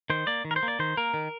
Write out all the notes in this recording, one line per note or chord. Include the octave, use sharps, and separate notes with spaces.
D#3 C5
A#3 D5
D#3
A#4
C5
A#3
D5
D#3 C5
A#3 A#4
D#3